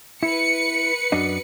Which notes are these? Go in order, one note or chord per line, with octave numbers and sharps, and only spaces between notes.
E4 B4 C#7
F#2 D4 D#5